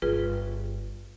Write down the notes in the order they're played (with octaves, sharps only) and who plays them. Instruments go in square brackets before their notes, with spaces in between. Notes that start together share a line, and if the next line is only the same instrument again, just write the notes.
[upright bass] G1 [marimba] F4 G#4 B4